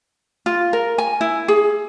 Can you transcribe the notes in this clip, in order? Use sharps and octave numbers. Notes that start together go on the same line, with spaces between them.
F4
A#4
G#5
E4
G#4